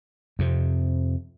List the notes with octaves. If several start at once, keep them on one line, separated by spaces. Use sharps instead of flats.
F2 C3